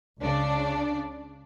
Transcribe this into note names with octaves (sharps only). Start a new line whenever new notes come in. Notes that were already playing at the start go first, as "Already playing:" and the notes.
C#2 C#3 D4 D5